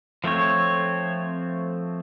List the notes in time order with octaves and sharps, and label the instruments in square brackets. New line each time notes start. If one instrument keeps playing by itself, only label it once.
[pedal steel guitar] F3 A3 C4 C#5